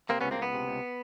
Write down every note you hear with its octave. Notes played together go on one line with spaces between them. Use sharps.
C3 A#3 C4
C#2 B3 C#4
A#3 C4
C#2 B3
C3
C#2